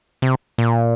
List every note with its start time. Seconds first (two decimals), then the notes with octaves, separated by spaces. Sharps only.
0.22 C3
0.58 A#2